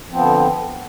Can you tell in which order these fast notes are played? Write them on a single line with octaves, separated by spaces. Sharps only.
F3 C4 B3 D3